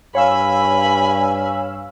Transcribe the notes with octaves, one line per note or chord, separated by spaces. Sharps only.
G2 C#5 F5 G#5 B5 E6